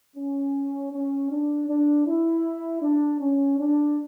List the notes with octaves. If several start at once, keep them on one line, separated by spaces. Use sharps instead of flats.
C#4
C#4
D4
D4
E4
D4
C#4
D4